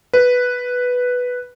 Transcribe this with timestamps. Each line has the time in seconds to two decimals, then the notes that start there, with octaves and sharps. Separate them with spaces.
0.13 B4